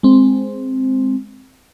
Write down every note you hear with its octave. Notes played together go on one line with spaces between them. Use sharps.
G#3 C4